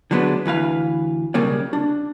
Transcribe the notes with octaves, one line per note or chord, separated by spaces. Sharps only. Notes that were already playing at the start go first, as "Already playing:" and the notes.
D3 F#3 G#3 B3 D4 B4
D2 E3 B4 F5
B1 C#3 G3 A#3 D5
D4